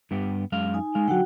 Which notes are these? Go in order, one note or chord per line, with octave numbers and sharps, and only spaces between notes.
G2 B3 G4
F#2 G#3 F5
D#4 G#5
G#3 F5
D3 F#3 F#4 F#5 G5